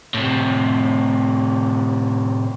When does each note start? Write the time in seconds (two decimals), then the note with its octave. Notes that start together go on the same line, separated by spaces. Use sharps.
0.14 A2 C3